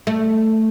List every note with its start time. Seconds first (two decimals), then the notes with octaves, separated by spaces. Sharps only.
0.07 A3